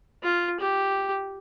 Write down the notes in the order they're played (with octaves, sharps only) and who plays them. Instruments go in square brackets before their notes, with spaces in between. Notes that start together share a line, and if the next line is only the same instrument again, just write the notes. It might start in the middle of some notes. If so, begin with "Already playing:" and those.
[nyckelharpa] F4
G4